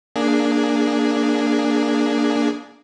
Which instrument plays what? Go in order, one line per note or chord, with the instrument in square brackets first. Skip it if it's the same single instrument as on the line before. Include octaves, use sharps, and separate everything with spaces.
[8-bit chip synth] A#3 D4 G#4